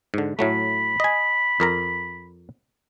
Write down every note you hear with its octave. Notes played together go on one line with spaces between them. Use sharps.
G#2 D3
A2 F#3 A3 B5
D#5 G#5
F2 A#4 A#5